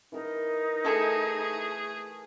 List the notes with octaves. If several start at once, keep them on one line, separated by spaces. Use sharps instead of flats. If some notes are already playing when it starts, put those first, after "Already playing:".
E3 D#4 A#4 A#5
A3 E4 G#4 A4